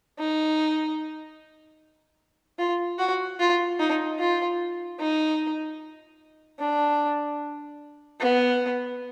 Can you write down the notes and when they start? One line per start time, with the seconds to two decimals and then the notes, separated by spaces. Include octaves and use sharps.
0.18 D#4
2.58 F4
2.99 F#4
3.39 F4
3.79 D#4
4.19 F4
5.00 D#4
6.59 D4
8.20 B3